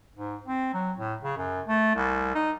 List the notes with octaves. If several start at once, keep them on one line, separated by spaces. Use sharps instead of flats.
G#2
C4
F#3
A2
C#3
F#2
A3
C2
D#4